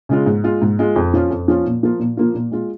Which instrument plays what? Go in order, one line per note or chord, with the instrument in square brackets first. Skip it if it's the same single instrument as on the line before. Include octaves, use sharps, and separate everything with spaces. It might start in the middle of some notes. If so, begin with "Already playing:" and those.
[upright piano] C#3 G#3 F4
G#2
G#3 F4
G#2
G#3 F4
F2
F3 C#4 F4
F2
F3 C#4 F4
A#2
F3 A#3 F4
A#2
F3 A#3 F4
A#2
G#3 F4